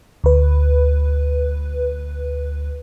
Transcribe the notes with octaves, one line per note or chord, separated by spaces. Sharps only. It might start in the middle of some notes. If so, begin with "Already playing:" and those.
D2 B4